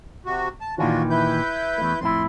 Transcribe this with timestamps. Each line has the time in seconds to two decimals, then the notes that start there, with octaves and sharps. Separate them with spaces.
0.25 C3 F#4
0.61 A5
0.78 A#2 D#3 E3 D4 F4 F#4
1.10 E4 B4 G6
1.78 E2 A3
2.01 F2 A2 E4 C6